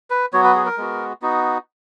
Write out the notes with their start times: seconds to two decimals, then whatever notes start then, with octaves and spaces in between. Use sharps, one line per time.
0.10 B4
0.33 F#3 B3 F#4 C#5
0.44 B4
0.55 G#4
0.66 A#4
0.77 G#3 B3 F#4
1.22 B3 D#4 F#4